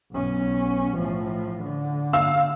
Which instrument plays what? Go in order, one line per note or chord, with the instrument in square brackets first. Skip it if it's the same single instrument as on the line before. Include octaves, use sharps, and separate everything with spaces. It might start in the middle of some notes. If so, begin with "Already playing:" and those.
[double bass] B1 C#4
A2 F3
D3
[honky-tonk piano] F5 E6